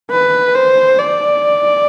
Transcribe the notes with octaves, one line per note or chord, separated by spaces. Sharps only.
B4
C5
D5